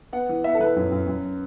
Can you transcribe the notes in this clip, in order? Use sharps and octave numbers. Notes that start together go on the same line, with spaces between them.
B3 F#5
E3
B3 E5
A4
E3 B4
F#2
F#2
F#2